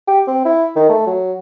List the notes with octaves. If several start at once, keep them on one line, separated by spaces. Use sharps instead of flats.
G4
C4
E4
D#3
A3
F#3